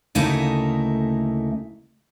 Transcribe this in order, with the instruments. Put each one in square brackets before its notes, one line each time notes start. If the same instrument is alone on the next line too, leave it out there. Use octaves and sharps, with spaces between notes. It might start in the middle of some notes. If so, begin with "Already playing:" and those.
[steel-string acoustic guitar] D2 C#3 A3 A#3 D#4 E4